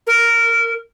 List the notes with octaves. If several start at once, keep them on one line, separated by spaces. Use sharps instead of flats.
A#4